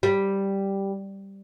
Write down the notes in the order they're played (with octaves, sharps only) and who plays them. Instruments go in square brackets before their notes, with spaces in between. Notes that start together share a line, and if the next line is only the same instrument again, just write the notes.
[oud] G3